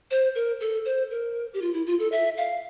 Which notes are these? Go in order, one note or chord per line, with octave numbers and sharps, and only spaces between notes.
C5
A#4
A4
C5
A#4
G4
F4
E4
F4
A4
E5
F5